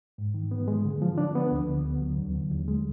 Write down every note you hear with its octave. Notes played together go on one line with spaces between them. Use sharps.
G#2
D#3
B3
G#3
D3
F3
D4
B3
D2
D3
B3
F#3
D#2
D3
D#2
G#3